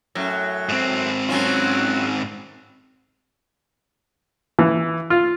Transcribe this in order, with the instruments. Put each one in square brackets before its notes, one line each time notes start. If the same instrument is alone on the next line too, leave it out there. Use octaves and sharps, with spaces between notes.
[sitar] F#2 A2 F#3
[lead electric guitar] G#2 C4
[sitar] F#3 C#4 F4
[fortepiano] E3
F4